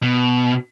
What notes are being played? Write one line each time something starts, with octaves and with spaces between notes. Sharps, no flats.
B2